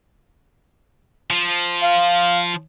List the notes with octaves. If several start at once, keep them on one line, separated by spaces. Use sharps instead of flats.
F3
F5